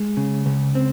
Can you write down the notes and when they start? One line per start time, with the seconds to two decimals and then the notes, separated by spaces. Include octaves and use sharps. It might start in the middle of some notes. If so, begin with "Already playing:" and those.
Already playing: G#3
0.17 C#3
0.46 C#2
0.75 C4